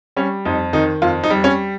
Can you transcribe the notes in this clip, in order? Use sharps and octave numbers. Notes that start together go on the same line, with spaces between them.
G3 C#4
F2 D#4
D#3 D#4
F2 F4
D#4
G3
C#4